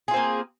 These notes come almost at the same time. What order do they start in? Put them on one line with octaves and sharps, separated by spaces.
G#4 F4 C4 A#3